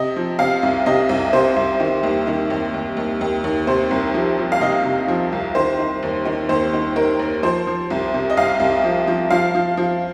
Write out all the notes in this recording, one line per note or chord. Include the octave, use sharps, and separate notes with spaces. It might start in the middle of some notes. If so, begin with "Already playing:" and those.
Already playing: C3 D#5
F3
C3 F5
C2
C3 D#5
C2
C3 C5
C2
D#3
D#2
D#3
D#2
D#2
D#2
D#2
D#2
C3 C5
C2
F3
F3
F5
C3 D#5
C3
F3
C2
D#3 C5
D#3
D#2
D#3
D#2 C5
D#3
D#3 A#4
D#2
F3 C5
F3
C2
C3
D#5
C2 F5
C2
F3
F3
F3 F5
F3
F3